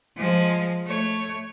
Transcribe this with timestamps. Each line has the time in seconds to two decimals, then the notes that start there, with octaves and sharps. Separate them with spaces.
0.16 F3 G#3
0.86 A3 C#5